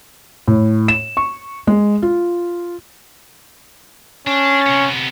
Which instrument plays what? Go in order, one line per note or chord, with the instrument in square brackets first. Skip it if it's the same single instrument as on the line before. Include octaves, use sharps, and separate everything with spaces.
[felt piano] A2
E7
C#6
G#3
F4
[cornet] C#4 [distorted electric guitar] D4
[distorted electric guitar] C3 B3